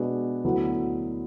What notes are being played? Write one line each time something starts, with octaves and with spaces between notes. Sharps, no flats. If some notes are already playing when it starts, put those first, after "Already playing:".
Already playing: B2 G#3 D4 G#4 B4
D2 D3 F#3 B3 E4